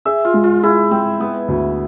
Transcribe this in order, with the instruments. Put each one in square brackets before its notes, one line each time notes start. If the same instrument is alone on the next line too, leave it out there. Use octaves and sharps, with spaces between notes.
[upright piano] G#4 [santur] E5
[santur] F4
[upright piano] G#3
[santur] F4
[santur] E4 [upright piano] G#4
[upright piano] G#3 [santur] C4
[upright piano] G#3 [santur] B3
[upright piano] D2